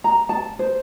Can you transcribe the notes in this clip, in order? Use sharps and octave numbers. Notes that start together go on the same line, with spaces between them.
A#5
A5
C5